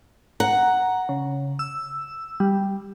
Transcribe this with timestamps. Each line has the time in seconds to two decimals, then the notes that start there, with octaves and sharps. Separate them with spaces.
0.40 F#5 A#5
1.09 C#3
1.59 E6
2.40 G3